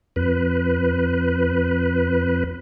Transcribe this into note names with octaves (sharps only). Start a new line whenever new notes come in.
F2 B4